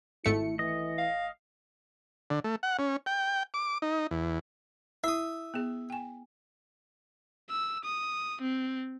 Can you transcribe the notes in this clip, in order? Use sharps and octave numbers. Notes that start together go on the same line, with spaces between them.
G#1 A3 E4 C#7
E3 D#5
F5
D3
A3
F#5
C#4
G5
D6
D#4
E2
E4 E5 D#6
B3 G#4
G5 G#5
E6
D#6
C4